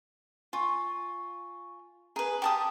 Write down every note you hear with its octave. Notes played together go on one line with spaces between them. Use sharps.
F4 G#5 C#6
G#4 B4 G#5 A#5
G4 A5 D#6